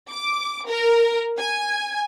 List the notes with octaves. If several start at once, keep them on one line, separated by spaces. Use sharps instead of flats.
D6
A#4
G#5